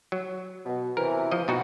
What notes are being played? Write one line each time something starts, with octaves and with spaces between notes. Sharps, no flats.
F#3
B2
C3 E3 A#4
F3 D#5
B2 D#4 F#4 F#5 G5